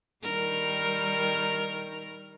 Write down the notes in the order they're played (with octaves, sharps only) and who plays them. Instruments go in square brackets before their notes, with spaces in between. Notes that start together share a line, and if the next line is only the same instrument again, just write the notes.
[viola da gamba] D#3 G3 A#4